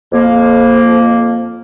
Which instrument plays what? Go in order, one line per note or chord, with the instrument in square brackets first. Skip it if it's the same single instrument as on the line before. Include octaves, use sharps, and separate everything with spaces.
[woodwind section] F2 F3 A#3